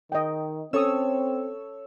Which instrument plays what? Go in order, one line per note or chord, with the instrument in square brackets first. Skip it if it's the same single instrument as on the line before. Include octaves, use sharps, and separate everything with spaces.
[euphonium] D#3 [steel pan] D#5 G5
[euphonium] C4 [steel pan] C#4 D#6 [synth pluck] A4 C#5 E6